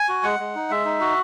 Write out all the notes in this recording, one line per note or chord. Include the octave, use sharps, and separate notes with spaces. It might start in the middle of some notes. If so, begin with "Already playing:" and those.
Already playing: G#5
F#4
G#3 F#5
G#3
D#4
G#3 E5
D#4
F#4